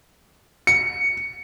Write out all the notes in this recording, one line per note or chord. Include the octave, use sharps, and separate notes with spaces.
C#7